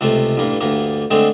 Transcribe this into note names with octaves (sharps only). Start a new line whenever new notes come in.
C#2 C3 A3
A1 G2 A#3
D2 G2 A#3
D3 G#3 A3 C4